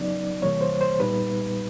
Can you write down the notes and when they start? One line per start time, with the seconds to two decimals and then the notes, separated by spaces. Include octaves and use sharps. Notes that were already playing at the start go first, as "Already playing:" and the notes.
Already playing: C#3 F#3 B3 D#4 D5
0.42 C3 E3 G3 A#3 C#5
0.61 C5
0.81 C5
1.00 A#2 G3 B3 D#4 B4